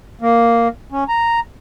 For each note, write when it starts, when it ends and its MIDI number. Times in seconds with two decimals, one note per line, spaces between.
0.21 0.68 58
0.92 1.04 61
1.09 1.40 82